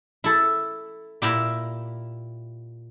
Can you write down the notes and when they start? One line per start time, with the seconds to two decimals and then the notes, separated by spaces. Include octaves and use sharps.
0.24 E4 A4
1.22 A#2 E4 G4